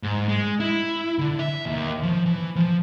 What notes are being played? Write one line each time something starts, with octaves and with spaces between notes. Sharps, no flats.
G#2
G#3
E4
D3
E5
D#2
F3
E3
F3